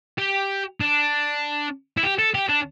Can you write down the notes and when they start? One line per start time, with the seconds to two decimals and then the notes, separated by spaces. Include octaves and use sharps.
0.18 G4
0.80 D4
1.97 E4
2.03 G4
2.19 A4
2.35 G4
2.49 D4